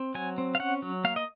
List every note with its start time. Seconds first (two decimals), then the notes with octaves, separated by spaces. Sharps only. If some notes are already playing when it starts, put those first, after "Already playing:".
Already playing: C4
0.15 F#3 G#5
0.38 C4
0.55 F5
0.60 C#4 F#5
0.82 F#3
1.04 A#3 F5
1.16 D#5